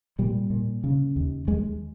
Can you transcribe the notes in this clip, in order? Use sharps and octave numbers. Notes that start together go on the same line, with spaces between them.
A#2 G3
A#2
C#3
D#2
D#2 G#3